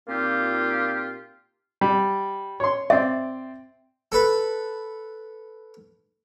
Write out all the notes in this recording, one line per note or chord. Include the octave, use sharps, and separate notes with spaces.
A#2 A#3 C4 D#4 F4 G4
G3
C#5 C6
C4 D5 E5
A4 B4